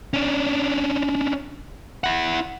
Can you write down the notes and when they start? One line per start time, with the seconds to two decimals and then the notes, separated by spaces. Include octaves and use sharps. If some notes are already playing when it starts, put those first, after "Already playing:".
0.14 C#4 D4
2.04 E4 F#5